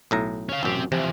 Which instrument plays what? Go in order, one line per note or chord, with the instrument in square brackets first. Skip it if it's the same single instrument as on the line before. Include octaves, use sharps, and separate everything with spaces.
[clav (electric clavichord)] B1 A2 A#5
[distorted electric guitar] C#4 F5
[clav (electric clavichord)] A1 F#2 [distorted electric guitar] C4 G4
[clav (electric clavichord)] C3 [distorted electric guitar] E3 F3